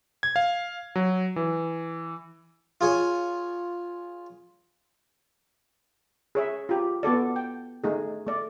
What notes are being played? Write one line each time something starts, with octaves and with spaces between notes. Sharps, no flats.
G#6
F5
F#3
E3
F4 G#4 C#5 G#5
G#4 C#5 E5
F4 G4
B3 F#4 A4 D5
G5
A3 D#4 G#4
A3 D5